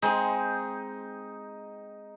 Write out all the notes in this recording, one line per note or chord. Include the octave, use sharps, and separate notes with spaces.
G#3 C4 D#4 G#4